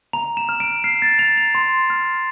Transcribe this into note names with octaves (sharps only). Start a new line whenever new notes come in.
A#5 F7
E7
F6
D7
F6 C7
A6
A#5 F7
F7
C6
F6